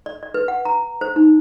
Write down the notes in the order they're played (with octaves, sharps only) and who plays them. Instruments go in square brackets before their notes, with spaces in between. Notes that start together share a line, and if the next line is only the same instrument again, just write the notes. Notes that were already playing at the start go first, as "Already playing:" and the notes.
[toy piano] D5
D5
B4
F#5
A#5
C5
D#4